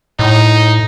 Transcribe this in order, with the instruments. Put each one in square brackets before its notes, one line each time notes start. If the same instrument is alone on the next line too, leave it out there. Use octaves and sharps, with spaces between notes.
[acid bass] A2 [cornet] D#4